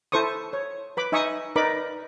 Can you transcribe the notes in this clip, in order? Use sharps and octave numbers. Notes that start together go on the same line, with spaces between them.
E4 A4 C5 C#6 D#6
C#5
B4 B5 D6
D#4 E5 G#5 C#6 D#6
D#4 A#4 B4 D5 B5 D6